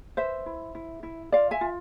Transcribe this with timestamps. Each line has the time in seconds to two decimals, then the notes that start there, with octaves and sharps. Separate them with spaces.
0.17 B4 C5 E5
0.46 E4
0.75 E4
1.03 E4
1.32 F4 D5 F5
1.51 E5 G#5
1.61 F4